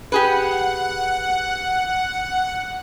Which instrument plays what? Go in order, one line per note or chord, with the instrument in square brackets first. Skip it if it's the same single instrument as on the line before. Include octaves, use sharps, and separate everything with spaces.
[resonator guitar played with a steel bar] G4 G#4 B4 [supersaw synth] F#5